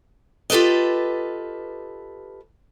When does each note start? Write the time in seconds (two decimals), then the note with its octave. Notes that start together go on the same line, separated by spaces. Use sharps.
0.50 F4 G4 A4 B4 D#5